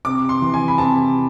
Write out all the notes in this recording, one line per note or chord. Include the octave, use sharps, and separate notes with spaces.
C3 D6
C6
E3
G#5
B5
C3 A5